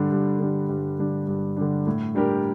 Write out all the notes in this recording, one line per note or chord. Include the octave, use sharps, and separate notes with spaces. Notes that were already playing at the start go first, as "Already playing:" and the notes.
Already playing: G2 D3 G3 D4
G2
D3 G3 D4
G2
D3 G3 D4
G2
D3 G3 D4
A2
G3 D4 G4 A#4